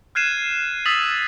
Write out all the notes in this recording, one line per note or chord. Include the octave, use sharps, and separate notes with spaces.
F6 F#6 G#6 C7 D#7 E7
D#6 E6 A6 B6 F7 F#7